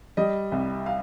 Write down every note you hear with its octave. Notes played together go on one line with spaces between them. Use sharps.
G3 D#5
C2
F5